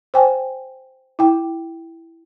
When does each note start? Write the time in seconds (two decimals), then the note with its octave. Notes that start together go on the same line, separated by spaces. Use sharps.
0.14 C5 G5 G#5
1.19 E4 G5